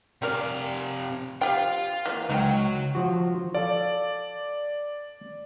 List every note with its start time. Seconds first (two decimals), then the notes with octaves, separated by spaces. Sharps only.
0.22 C3 G3 A#4 D5 F5
1.41 F3 F4 G4 G5
2.06 E3 G#3 A#3
2.29 C#2 F#3 D#4 A#4 G5
2.95 F3 F#4
3.55 A4 D5 F5